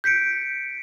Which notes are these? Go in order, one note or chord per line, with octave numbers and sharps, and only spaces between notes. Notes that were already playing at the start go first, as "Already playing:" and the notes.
G6 B6 C#7 D7